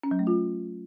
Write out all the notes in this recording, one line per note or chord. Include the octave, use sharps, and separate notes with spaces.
C#4
F#3
A3
F4